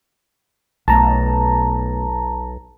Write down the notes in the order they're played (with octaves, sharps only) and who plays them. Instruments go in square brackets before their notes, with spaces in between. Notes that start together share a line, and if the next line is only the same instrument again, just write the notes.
[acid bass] B1 [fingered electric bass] B2 A3 B3 [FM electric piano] A5 A#5